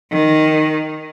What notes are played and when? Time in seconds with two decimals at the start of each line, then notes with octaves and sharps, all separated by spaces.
0.11 D#3